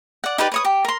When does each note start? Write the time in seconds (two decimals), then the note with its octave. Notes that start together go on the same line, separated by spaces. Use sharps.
0.24 D5 F#5
0.38 D#4 G4 B4 D5
0.52 B4 C#5 D#6
0.65 G4
0.85 A#4 C6